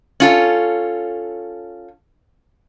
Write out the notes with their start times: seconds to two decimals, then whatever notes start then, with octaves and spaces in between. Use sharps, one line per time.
0.20 C#4 F4 A4